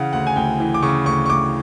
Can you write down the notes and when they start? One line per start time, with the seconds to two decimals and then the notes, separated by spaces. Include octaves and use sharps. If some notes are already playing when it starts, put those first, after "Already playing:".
Already playing: C#3 E3 F5 F#5
0.13 D2 F#5
0.27 G#5
0.36 D2 G5
0.60 E3
0.74 D6
0.82 C#3 C#6
1.06 D2 C#6
1.26 C#6
1.29 D2 D6